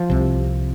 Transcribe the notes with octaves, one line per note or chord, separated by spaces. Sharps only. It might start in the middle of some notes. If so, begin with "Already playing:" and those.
Already playing: F3
C2 C3